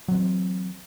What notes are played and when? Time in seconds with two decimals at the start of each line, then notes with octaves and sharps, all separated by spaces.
0.08 F#3
0.12 C4
0.15 E3